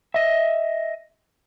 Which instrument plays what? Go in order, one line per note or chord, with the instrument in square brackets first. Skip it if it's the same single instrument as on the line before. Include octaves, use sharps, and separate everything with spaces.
[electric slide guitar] D#5 E5